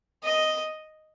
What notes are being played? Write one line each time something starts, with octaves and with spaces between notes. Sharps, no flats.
D#5